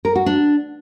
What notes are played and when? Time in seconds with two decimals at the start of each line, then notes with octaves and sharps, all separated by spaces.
0.05 A#4
0.16 F#4
0.26 D4